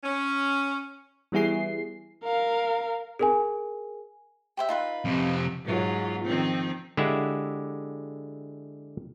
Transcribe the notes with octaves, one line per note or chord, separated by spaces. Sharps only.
C#4
E3 G3 B3 E4 G#4 C7
A#4 F5
G#4 A#4 G#5
G4 C5 E5
D#4 F4 B4
F2 C3
G#2 F#3 F4
D#3 F3 C4
D3 G#3 E4 G4 E5 F#5